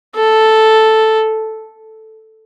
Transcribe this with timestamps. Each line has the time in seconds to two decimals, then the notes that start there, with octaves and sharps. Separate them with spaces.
0.16 A4